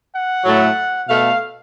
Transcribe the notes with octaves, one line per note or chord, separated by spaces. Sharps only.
F#5
A2 F#3 A3
B2 A3 F5